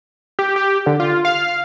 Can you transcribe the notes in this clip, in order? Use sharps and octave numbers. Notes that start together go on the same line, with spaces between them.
G4
G4
D3
F4
F5